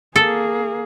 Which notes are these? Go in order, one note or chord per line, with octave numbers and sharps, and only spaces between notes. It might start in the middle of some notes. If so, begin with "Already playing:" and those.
A#3 G#4 A4